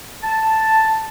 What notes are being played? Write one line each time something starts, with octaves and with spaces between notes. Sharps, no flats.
A5